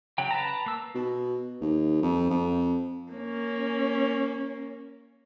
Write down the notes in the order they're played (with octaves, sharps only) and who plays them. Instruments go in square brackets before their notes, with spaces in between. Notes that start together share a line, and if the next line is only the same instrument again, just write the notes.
[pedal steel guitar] C#3 F#3 G5
B4 A5 A#5
A#3 E6
[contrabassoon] B2
D#2
F2
F2
[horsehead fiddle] A#3 C#4